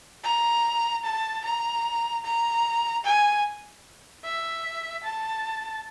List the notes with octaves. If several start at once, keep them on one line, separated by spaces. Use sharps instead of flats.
A#5
A5
A#5
A#5
G#5
E5
A5